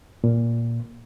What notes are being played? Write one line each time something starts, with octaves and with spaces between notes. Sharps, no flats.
A#2